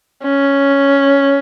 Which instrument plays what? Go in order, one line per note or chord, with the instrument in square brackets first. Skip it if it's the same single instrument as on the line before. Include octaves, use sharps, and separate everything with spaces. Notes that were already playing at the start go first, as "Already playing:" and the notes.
[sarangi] C#4